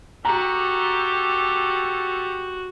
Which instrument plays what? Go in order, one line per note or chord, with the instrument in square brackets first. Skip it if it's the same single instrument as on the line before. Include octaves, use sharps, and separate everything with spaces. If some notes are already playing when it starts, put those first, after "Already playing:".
[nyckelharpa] F#4 [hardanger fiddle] G4 [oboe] A4 [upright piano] A#5